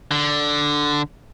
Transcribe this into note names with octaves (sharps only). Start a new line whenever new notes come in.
D3